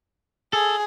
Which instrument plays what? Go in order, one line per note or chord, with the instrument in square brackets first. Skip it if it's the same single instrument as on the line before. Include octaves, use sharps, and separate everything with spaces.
[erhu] G#4 [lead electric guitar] A4